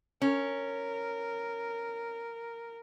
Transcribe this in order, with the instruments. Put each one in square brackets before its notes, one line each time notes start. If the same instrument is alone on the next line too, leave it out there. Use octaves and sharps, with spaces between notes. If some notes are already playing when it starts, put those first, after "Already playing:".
[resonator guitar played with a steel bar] C#4 [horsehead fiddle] A#4